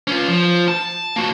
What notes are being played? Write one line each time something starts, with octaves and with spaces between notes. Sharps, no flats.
C#4 F4
F3
A5
A#3 F#4